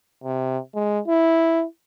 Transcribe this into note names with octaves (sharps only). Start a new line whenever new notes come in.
C3
G#3
E4